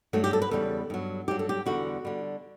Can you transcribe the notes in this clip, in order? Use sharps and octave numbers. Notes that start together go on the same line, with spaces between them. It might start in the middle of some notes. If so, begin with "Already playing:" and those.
G2 F#3 A3
G4
A4
B4
E2 C#3 G3 A4
G2 F#3
G2 F#3 G4
A4
G4
E2 D3 G3 F#4
D3 G3